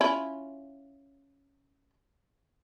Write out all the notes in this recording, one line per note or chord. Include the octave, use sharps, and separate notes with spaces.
C#4 E4 F4